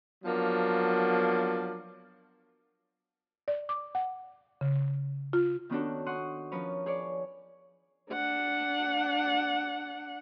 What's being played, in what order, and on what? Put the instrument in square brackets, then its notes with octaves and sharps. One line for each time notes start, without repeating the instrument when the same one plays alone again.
[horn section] F3 F#3 A#3 B3 D4
[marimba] D5
D6
F#5
C#3
F4
[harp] D#3 B3 C#4 D4 F#4 A4
F#5 C6 C#6 D#6 F#6
F3 C#4 A#4 B4 C#5
G#4 C#5 D5
[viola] D4 F#5